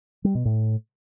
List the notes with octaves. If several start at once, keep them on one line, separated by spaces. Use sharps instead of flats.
G3
B2
A2